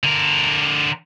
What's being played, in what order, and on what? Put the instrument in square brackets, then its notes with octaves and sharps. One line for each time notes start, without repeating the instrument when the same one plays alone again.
[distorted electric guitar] D3 A#4